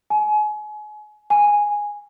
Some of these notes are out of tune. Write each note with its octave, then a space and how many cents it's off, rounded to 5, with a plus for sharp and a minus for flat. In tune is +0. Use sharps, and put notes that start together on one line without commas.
G#5 +30
G#5 -5